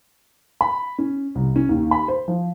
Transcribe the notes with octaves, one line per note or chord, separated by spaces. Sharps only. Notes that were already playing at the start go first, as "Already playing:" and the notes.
B5
C#4
C2
C#4
D#2
B5
C5
F3